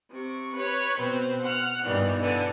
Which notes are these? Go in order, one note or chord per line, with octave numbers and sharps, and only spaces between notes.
C3 C#6
B4 C#5
B2 C4 B4
F#5 F6
G2 B2 D#3 E3 G3
D3 E3 B3